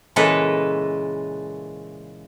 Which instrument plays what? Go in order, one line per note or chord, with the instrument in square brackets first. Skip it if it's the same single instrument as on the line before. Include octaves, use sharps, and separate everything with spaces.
[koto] A#2 C#3 E3 G#3 A4 B4